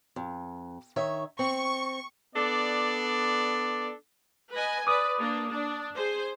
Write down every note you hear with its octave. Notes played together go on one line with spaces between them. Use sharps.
F2
D#3 C#5 E5
C4 C#6
B3 D4 A4 D5
B4 D#5 G#5
B4 D5 D6 D#6
A#3 D4
D4
G#4 C5